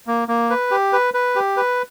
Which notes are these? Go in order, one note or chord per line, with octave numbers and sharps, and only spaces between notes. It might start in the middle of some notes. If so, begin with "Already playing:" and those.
A#3
A#3
B4
G4
B4
B4
G4
B4